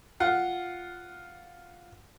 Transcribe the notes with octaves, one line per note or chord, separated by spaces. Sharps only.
F4 F5 F#5